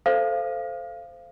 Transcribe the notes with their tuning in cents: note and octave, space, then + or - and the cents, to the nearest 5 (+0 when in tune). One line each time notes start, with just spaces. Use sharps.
A4 +0 C5 -5 F5 -20